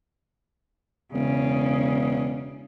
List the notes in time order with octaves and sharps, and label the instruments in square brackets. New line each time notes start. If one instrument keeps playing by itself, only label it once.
[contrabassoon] E1 [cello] C#3